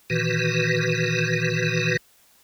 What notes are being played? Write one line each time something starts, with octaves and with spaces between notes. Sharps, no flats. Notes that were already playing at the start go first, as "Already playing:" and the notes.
A#2 D#3 E3 F#4 B4